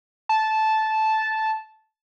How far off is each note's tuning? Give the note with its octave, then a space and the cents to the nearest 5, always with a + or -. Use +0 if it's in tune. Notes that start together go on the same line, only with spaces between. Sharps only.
A5 -10